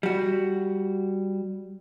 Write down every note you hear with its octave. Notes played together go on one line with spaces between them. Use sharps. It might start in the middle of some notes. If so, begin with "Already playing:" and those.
G3 F#4